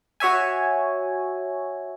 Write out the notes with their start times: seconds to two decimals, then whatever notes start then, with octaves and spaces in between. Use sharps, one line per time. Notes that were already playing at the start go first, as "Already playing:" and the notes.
0.20 F#4 C#5 E5 G#5